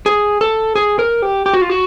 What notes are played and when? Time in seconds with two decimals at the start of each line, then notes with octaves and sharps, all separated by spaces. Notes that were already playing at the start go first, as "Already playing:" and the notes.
0.06 G#4
0.41 A4
0.75 G#4
0.99 A#4
1.22 G4
1.46 G4
1.54 F#4
1.62 F4
1.70 F#4